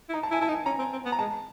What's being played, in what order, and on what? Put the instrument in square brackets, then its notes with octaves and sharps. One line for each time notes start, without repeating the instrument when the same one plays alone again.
[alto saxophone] E4
[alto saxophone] D#4 [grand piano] A#5
[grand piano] A5
[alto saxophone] E4 [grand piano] G#5
[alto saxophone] E4 [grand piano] A5
[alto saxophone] D#4
[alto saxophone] C#4 [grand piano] A#5
[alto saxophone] C4
C4
B3
[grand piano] A#5
[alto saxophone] G#3 [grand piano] A5